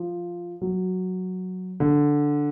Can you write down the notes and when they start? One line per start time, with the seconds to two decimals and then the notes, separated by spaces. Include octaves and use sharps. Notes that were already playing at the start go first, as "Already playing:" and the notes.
Already playing: F3
0.61 F#3
1.80 D3